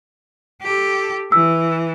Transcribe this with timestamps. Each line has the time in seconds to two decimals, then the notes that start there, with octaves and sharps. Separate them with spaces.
0.62 G4 A4
1.32 E3 E6